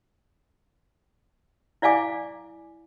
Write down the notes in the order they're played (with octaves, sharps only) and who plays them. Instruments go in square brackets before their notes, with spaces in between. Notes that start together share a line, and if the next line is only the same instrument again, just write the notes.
[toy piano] E4 D5 F5 G#5 D6